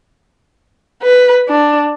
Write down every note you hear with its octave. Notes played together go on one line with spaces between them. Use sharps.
B4
D4